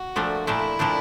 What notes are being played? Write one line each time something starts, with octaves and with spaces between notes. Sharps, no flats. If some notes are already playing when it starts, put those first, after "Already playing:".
Already playing: F#4
A#2 F3 A3 D4
A#2 F3 A3 D4 E4
A#2 F3 A3 D4